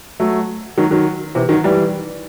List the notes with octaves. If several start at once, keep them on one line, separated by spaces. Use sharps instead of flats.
F#3 A3
D#3 F#3
D#3 F#3
C3 E3
D#3 F#3
E3 G3